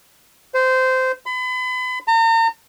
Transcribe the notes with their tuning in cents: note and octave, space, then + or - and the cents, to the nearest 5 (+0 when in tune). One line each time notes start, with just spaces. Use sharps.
C5 -15
B5 +35
A#5 -40